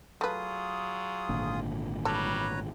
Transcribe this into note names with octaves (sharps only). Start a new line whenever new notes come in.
F#3 A3 F4 G#4 B4 D#6
G#1 A#2 D3
G3 A4 B4 C#5 A#5